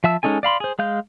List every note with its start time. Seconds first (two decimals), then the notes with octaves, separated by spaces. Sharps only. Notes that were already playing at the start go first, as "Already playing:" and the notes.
0.04 F3 E5 A5 E6
0.23 G#3 C#4 D#4 A4 G#5
0.43 D5 F5 B5 C6
0.60 G#4 C5
0.79 G#3 F5 G6